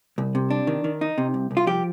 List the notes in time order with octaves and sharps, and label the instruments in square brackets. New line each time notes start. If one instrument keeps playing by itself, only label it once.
[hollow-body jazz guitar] C2
C3
D4
D#3
D#3
D#4
C3
C2
C2
F4
F3 G4